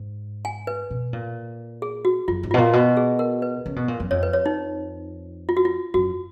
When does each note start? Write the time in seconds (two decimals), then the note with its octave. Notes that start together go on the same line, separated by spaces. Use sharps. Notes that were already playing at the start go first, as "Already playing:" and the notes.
Already playing: G#2
0.45 G#5
0.67 B4
0.91 B2
1.13 A#2
1.82 G#4
2.05 F#4
2.28 F#2 F4
2.43 G#2
2.51 B2 F4
2.58 A#2
2.73 B2 F#4
2.97 G#4
3.19 A#4
3.42 B4
3.66 C#3
3.76 B2
3.88 A#2
4.00 F#2
4.11 F2 C#5
4.23 B4
4.33 C#5
4.46 D#4
5.49 F4
5.57 F#4
5.65 F4
5.94 F#2 F#4